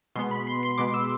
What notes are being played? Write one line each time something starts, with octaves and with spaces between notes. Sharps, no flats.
B2 G#3 B3 C6
B5
C6
C6
B2 G#3 B3 D6
E6